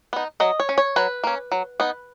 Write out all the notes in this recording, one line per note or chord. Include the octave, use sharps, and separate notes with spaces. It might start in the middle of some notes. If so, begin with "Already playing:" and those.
B3 D#4
F#3 D#5
C#5
C#4
C#5
F#3 B4
A#3 C#4
F#3
B3 D#4